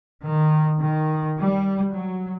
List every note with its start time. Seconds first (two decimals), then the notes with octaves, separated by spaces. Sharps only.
0.24 D#3
0.77 D#3
1.39 G3
1.93 F#3